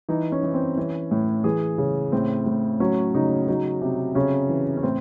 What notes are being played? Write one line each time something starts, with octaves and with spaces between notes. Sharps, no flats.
E3 D#4
C#4
E3
C4
E3 C#4
A2
E3 G#4
C#3
A2 C4
A2
F#3 C#4
C#3 D#4
F#3 D#4
C3
C#3 C#4
E3
C#4
A2 C4